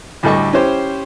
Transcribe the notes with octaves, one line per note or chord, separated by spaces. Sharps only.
D2 A2 G3 A4 D#5 C#6
C#4 E4 G4 C5